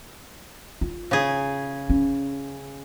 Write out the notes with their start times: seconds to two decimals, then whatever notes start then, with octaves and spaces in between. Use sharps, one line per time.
0.81 F4
1.11 C#3 G#4
1.90 C#4